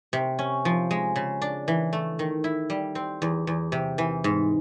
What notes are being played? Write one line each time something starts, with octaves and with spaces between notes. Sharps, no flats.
C3
C#4
F3
G#3
C#3
D4
E3
A3
D#3
E4
G3
C4
E2
E2
C3
E3
G#2